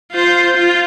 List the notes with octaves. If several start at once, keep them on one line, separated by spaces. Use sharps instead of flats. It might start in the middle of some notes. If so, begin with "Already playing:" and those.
F4 C5
F4